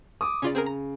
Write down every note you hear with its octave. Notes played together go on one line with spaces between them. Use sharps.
D6 D#6
C#3 C#4 F4 D5
C4 G#4 A#4
A#5